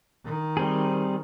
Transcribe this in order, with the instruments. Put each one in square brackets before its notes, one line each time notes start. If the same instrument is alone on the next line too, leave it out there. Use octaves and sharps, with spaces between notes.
[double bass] D#3
[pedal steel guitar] G3 C4 G#4